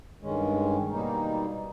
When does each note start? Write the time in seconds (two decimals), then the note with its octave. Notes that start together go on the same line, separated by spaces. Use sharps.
0.22 G2 D#3 G#3 C#4
0.91 B2 G3 A#3 D#4